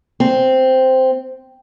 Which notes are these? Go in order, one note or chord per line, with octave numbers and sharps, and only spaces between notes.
C4